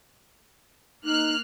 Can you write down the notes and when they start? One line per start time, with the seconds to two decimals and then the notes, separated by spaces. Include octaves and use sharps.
1.04 A#3 D#4 F6 F#6